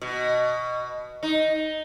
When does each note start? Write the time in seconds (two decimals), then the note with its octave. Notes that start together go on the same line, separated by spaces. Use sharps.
0.02 B2
1.23 D#4